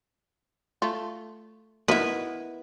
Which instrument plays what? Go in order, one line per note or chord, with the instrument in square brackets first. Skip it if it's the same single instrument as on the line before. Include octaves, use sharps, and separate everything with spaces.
[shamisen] A3 F4
[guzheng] B3 E4 [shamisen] A#4 D#5 E5